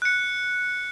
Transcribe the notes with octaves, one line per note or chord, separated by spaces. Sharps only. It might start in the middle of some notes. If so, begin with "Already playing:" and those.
F#6 C#7